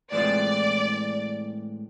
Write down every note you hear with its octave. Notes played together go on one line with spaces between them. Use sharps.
A2 E3 G#3 C4 F4 D5